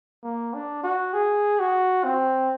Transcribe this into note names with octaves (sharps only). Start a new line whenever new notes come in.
A#3
D4
F#4
G#4
F#4
C4